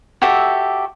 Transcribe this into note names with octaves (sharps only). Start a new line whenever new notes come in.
F#4 G4 A4 E5